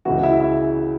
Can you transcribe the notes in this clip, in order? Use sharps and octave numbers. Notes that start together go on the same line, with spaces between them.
C#2 C#3 E3 F#4
E4
E4